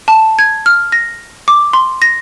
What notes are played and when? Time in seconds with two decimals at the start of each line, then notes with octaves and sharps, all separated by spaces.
0.08 A5
0.39 G#6
0.66 F6
0.92 A#6
1.48 D6
1.73 C6
2.02 A#6